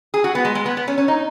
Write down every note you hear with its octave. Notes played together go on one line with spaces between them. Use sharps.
G#4
F#4
B3
G#3
G#3
B3
B3
C#4
C#4
D#4